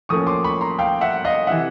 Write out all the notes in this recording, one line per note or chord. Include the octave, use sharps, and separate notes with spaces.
A2 F3 A#3 C#4 C#6 D#6
C6 D6
B5 C#6
A#5 C6
F5 G5
E5 F#5
D#5 F5
C3 E3 E5 F#5